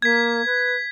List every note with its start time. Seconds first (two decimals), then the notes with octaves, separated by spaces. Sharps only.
0.02 A#3 G#6 B6
0.46 B4